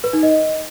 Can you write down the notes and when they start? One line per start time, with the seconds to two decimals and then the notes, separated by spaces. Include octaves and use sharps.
0.04 B4
0.13 D#4
0.23 D#5